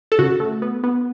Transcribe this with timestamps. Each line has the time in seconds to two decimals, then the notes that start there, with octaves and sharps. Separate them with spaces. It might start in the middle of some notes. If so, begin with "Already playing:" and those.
0.12 A4
0.19 C#3 F#4
0.40 A3
0.62 B3
0.84 B3